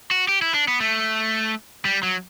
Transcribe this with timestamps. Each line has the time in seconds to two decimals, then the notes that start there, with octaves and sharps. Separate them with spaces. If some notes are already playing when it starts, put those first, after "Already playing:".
0.11 F#4
0.29 G4
0.42 E4
0.54 D4
0.68 B3
0.81 A3
1.85 G3
2.03 F#3